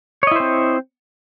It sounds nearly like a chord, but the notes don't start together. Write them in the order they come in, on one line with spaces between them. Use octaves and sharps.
C#5 D#5 E4 C5 C4